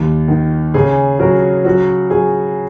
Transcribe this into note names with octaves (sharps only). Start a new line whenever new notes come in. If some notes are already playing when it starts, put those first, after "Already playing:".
Already playing: D#2
D#3
C#3 G#4
F#3 F#4 A#4
F#3 F#4
F#3 G#4